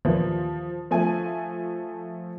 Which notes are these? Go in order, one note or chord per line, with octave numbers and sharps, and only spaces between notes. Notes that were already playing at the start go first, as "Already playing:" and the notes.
D#2 A#2 E3 F3
F3 A3 G#5